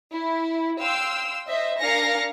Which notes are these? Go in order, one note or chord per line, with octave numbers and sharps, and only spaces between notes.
E4
F5 G5 C6 E6
C5 D#5 E5
D4 A#4 F5 G#5 A#6 C#7